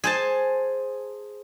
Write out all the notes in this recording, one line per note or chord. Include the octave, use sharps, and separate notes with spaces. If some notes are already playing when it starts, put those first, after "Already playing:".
G#4 C5 A5